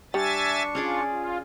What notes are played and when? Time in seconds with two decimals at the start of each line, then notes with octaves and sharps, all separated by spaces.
0.14 G3 D4 E5 G#5 C#6 A6
0.75 C#4 F4 G#4 D5
1.10 F4